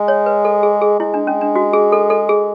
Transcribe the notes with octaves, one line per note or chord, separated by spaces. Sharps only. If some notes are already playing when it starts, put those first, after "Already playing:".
Already playing: G#3
C#5
B4
A4
G#4
G#4
G#3 E4
D4
C#4
D4
F#4
G#4
A4
A4
G#4